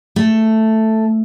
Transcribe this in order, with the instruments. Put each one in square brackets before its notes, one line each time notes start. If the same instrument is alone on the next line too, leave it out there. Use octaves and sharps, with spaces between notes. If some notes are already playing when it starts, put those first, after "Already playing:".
[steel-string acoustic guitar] A3